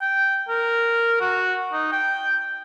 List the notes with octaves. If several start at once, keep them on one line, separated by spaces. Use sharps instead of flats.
G5
A#4
F#4
D#4
G5